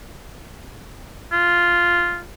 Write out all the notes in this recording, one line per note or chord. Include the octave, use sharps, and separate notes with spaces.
F4